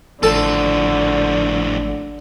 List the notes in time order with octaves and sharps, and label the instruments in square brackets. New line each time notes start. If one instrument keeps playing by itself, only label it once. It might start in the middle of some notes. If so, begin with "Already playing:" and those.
[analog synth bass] G#1 [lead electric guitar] A2 F3 [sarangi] D3 [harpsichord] A4 A5